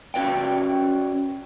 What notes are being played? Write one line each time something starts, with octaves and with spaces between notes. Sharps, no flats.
C#4 F#4 B4 D5 G5